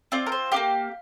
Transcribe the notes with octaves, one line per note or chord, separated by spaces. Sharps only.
C4 F4 D5
A#4
C5
A#3 D4 G4 F5